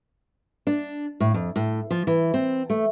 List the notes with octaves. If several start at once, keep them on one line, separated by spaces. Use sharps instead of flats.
D4
A2
F2
A2
F3
E3
C4
A3